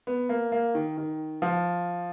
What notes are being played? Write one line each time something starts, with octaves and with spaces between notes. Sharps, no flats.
B3
A#3
A#3
D#3
D#3
F3